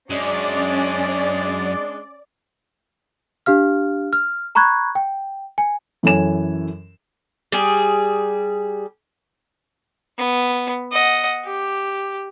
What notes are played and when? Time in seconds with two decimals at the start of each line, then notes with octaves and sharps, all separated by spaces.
0.10 F#2 G#3 C#4 D4 D5
3.46 D4 G4 F5 F6
4.13 F6
4.55 A#5 B5 C#6 F#6 G#6
4.95 G5
5.58 G#5
6.03 F#2 E3 C#4 A4 G#5 E7
7.52 G3 G#4
10.18 B3
10.92 D#5 F#5
11.45 G4